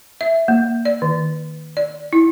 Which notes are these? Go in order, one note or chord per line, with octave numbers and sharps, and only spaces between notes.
E5
A#3
D5
D#3
D5
E4